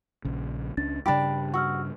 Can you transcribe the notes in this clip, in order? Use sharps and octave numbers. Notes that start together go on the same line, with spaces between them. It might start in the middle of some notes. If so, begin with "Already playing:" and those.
A#1 C#3
C#2 C#4 D4 A6
G2 C#3 D4 G4 G5 B5
F#4 C#6 E6 F6